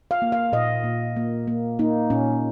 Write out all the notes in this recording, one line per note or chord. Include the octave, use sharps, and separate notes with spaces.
F5
A#3
F5
A#2 D#5
A#2
A#3
A#3
A#3 D#4
A#2 C#4